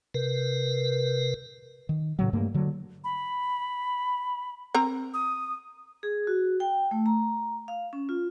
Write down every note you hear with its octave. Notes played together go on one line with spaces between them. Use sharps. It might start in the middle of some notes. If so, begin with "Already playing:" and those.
C3 A#4 B4
D#3
A2 C#3 F#3
G2 A3 A#3
D3 F#3
B5
C4 A#4 A#5
D#6
G#4
F#4
G5
A3
A#5
F5
C#4
F4